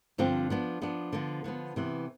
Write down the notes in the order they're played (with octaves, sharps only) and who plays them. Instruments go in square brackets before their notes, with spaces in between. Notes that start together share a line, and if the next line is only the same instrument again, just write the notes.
[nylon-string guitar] G2 D3 F3 C4 F4
F3 B3 D4
F3 B3 D4
D3 F3 B3
D3 F3 B3
C3 E3 B3